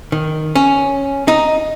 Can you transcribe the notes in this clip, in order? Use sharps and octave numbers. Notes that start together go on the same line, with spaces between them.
D#3
C#4
D#4